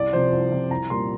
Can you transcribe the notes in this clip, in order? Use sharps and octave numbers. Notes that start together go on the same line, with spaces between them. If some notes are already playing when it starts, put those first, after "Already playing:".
Already playing: C2 D5
C3 F3 C5
C2
C3 F3
C2 A#5
A#2 G3 A#3 C6